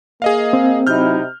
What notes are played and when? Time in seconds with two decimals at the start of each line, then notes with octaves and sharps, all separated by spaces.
0.22 A#3 G#4 D#5 F5
0.53 C4
0.87 C3 F#3 D#4 E4 F6 G6